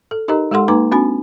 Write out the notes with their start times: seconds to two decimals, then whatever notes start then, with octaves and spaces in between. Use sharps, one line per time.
0.11 A4
0.28 D#4 G4 A#4 D#5 A#5
0.51 G#3 G4 A4 F#5 C6
0.68 A#3 D#4 B4 A#5 D6
0.92 C4 D4 F#4 G#5 B5